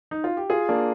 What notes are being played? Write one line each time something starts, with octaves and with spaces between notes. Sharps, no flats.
D#4
F4
G4
F4 G#4
A#3 D4